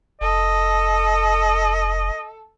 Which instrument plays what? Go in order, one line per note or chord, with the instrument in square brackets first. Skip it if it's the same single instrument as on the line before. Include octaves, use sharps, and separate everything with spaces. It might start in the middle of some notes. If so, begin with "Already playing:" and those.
[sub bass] F1 [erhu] A4 [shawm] D#5